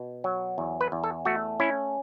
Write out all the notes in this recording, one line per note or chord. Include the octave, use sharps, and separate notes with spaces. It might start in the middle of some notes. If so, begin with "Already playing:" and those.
Already playing: B2
F#3
E2
B4
E2
A4
A3 F#4
C#4 E4